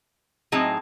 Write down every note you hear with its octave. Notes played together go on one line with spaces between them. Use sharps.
A2 F#3 C4 D#4 G#4